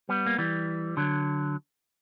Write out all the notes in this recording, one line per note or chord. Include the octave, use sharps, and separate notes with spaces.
G3 B3
A#3
E3 G3
D3 F#3